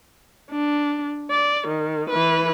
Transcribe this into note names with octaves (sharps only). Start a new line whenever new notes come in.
D4
D5
D#3
E3 B4